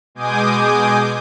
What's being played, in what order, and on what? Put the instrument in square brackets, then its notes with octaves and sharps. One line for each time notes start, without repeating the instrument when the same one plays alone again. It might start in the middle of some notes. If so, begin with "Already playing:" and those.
[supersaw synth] B2 G#3 G#5 D6 D#6 G6